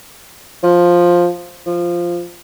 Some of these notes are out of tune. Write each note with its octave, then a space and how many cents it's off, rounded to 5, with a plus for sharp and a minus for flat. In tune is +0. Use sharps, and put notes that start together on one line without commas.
F3 +5
F3 -5